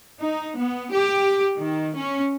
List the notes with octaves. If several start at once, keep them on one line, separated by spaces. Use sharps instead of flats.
D#4
B3
G4
D#3
C#4